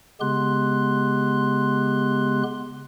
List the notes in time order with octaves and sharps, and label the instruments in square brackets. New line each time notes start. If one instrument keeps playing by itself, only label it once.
[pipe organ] C#3 G#3 B3 G4 C6 F#6